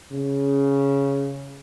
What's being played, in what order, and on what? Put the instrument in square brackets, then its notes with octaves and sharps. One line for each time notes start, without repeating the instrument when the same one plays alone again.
[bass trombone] C#3